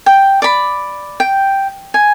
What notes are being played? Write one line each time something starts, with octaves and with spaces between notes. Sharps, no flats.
G5
D5 B5
G5
G#5